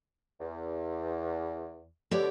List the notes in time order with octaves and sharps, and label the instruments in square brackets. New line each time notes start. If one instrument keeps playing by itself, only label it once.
[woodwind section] E2
[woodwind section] B2 D3 [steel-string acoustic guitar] G4 C#5 D5